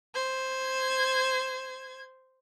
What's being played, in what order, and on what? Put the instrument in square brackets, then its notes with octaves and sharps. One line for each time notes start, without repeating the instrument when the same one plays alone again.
[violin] C5 G#6